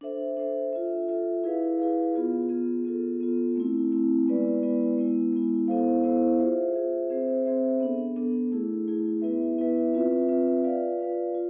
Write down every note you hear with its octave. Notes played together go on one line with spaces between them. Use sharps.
D4 A4 C5 E5
D4 A4 C5 E5
F4 A4 E5
F4 A4 E5
E4 G#4 B4 F5
E4 G#4 B4 F5
B3 F4 G#4
B3 F4 G#4
B3 F4 A4
B3 F4 A4
A3 C4 E4
A3 C4 E4
G#3 B3 E4 B4 D5
G#3 B3 E4 B4 D5
G#3 B3 E4
G#3 B3 E4
B3 E4 A4 C5 F5
B3 E4 A4 C5 F5
F4 G#4 C5 E5
F4 G#4 C5 E5
C4 G#4 C5 E5
C4 G#4 C5 E5
B3 D4 A4
B3 D4 A4
A3 E4 G#4
A3 E4 G#4
B3 E4 B4 E5
B3 E4 B4 E5
C4 F4 B4 E5
C4 F4 B4 E5
F4 B4 D5 F5
F4 B4 D5 F5
F4